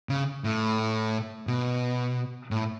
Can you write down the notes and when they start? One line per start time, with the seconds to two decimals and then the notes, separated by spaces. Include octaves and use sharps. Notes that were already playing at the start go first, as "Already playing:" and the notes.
0.09 C#3
0.44 A2
1.47 B2
2.51 A2